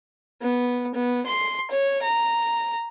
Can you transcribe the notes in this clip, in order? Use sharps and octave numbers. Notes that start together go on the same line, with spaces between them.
B3
B3
C6
C#5
A#5